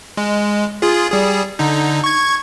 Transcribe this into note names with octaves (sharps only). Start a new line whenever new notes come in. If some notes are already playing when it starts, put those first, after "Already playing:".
G#3
F4 G#4
G3 G#4
D3 D#4
C#6 G#6